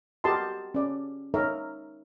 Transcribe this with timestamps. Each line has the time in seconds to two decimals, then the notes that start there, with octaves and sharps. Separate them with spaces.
0.24 F#4 G4 A#4 D#5 A5 C6
0.74 C#4 D5
1.34 D#4 A#4 C#5 E5